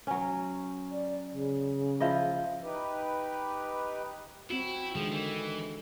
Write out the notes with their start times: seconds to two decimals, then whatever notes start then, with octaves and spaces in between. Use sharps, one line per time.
0.07 F#3 C#4
0.92 D5
1.32 C#3
2.00 F3 E4 D#5
2.63 D#4 G4 B4
4.50 C4 E4 F#4
4.95 D3 D#3 F3 G#3
5.12 E3